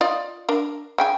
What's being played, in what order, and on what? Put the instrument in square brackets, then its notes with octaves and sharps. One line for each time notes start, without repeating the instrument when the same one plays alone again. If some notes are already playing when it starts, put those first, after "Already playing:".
[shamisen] F4 D5 D#5
D4 A#4
C#3 G5 G#5